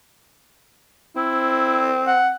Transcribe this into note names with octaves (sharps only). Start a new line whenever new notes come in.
C4 E4
F#5